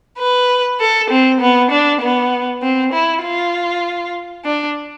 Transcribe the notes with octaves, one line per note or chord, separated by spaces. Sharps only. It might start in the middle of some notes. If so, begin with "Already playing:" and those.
B4
A4
C4
B3
D4
B3
C4
E4
F4
D4